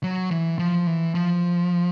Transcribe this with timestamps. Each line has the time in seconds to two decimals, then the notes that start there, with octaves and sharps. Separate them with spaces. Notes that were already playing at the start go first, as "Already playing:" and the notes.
0.03 F#3
0.31 E3
0.59 F3
0.87 E3
1.15 F3